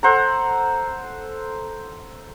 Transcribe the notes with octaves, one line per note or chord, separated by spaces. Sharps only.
A4 C5 F#5 A#5